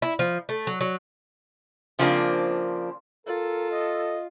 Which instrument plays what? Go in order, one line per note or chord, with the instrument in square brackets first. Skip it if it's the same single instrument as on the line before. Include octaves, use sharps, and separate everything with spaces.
[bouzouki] E4
F3
A3
F#3
F#3
[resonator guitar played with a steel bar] C#3 F3 A3 A#3 C4 D4
[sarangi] F4 [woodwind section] A4 [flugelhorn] A#4
[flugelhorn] D#5